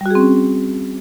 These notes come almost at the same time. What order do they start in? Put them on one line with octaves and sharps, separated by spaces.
G3 F#4 G#4 C4 C#4